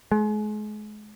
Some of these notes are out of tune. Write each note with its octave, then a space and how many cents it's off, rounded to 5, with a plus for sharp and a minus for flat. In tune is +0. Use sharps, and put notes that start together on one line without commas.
G#3 +35